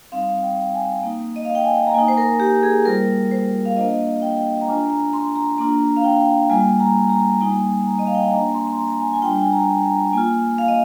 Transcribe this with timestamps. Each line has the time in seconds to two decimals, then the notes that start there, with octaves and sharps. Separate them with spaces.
0.12 G3 C4 D#4 F5
0.42 G5
0.74 G#5
1.03 A#3 D#4
1.36 D#5
1.45 F5
1.55 G5
1.64 G#5
1.87 A#5
1.94 A#3 G#5
1.98 D#4
2.08 C5
2.17 A#4
2.40 G4
2.63 G#4
2.85 G3 A#3 F4 A#4
3.31 C5
3.65 F5
3.76 A#3 D4 F4 D#5
4.22 G5
4.61 A#5
4.67 G#3 D4 F4 G#5
4.90 A#5
5.13 C6
5.36 A#5
5.58 A#3 D4 F4 A#5
5.97 F5
6.04 G5
6.50 G3 A#3 F4 G#5
6.80 A#5
7.10 A#5
7.40 G3 A#3 D#4 G#5
7.86 A#5
7.99 D#5
8.07 F5
8.15 G5
8.23 G#5
8.32 A#3 D4 F4 A#5
8.54 C6
8.67 C6
8.77 A#5
8.88 A#5
9.00 G#5
9.13 G#5
9.22 G3 D4 F4 G5
9.42 G#5
9.52 A#5
9.83 A#5
10.13 A#3 F4 G#5
10.58 F5
10.68 D#5